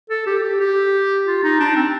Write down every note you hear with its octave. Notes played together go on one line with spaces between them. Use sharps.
A4
G4
G4
G4
F4
D#4
D4
C4